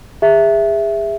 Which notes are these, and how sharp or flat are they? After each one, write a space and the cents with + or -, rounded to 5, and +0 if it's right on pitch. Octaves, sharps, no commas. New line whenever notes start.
G#4 -35 E5 +0